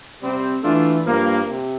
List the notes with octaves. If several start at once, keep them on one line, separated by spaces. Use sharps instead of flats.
C3 G3 C4
E3 A3 D4 F4
G2 F3 A#3
C3